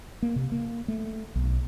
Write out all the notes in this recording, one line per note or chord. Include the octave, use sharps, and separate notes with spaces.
A#3
C3
A#3
A3
B1